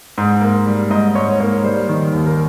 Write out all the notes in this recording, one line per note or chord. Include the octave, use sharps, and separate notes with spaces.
G#2
A#3
G3
G#2 D#5
G#2 C#5
A#3 C#5
G3 C5
D#3
D#2
A#4